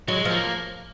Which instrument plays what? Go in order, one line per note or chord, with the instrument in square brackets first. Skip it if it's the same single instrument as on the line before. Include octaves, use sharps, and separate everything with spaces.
[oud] F#3 [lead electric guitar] G#3
[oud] F3 [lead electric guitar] A#3